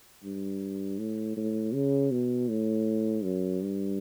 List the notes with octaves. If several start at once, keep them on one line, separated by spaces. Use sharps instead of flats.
G2
A2
A2
C#3
B2
A2
F#2
G2